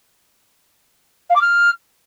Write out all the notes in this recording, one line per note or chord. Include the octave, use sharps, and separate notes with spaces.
F5
D6
F6